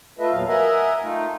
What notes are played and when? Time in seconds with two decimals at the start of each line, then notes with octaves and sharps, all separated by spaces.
0.19 A3 F4 A4 B4 D#5 E5
0.31 E2 A#2 F#3 F5
0.48 A#4 D#5 E5 F#5 G#5
1.03 A3 D#4 F4